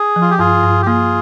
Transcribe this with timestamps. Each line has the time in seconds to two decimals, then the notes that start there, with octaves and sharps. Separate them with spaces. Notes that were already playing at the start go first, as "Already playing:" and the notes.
Already playing: G#4
0.16 F3
0.21 F4
0.31 G4
0.39 G2 F4 G#4
0.63 G2
0.82 G4
0.86 A#3 F4 G#4